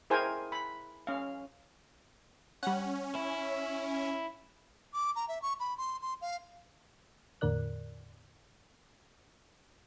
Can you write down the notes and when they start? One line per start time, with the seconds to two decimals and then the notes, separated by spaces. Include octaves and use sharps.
0.10 E4 G#4 A#4 C5 G5 G#5
0.52 B5
1.07 C#4 F5
2.63 G3 C#4 F#5
3.15 E4
4.94 D6
5.16 A#5
5.28 E5
5.42 C#6
5.60 B5
5.78 C6
6.02 C6
6.22 F5
7.41 E2 A2 D3 A#4 D5 F#6